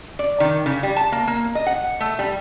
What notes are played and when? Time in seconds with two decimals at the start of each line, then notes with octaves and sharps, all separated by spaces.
0.19 D5
0.40 D#3
0.66 C#3
0.83 G3
0.96 A5
1.12 A#3
1.27 A#3
1.55 D#5
1.67 F#5
2.00 A3
2.19 G3